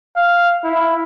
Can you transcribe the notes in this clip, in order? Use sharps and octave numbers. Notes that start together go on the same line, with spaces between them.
F5
E4